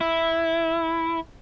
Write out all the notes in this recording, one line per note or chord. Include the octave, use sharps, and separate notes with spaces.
E4